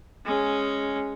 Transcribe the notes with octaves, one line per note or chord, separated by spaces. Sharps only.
G#3 C#4